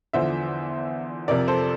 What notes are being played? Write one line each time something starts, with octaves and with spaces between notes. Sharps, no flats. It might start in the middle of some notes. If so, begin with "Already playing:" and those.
E2 D3 F3 C5 E5
F2 C3 F3 A#4 D5
A4 C5